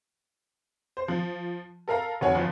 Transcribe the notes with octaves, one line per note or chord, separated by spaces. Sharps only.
C5
F3
A4 A#4 F5 A#5
F1 F#4 C#5 G#5
G1 F3